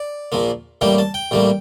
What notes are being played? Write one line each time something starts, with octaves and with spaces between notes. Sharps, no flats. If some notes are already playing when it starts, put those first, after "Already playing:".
Already playing: D5
A#1 A#2 F3 A#3
A1 A2 G3 A#3 G5
A5
G5
A1 A2 G3 A#3